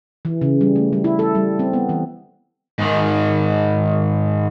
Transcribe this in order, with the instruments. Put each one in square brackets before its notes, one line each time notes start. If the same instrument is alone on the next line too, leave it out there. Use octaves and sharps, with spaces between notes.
[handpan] E3
C#3
G3
A3
G3
E4
A4
G3
C4
B3
E3
[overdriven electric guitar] G#2 D#3